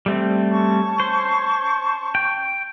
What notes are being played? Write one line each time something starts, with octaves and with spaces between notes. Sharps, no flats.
G3 A3 C4
C#4 A5 C#6
C5
G5